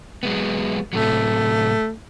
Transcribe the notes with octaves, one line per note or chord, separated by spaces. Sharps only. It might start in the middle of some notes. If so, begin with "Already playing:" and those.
F#3 G#3 B3
A2 C3 F#3 A3